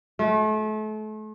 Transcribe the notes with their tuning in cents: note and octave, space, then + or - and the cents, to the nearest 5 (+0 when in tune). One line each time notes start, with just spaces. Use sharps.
A3 -35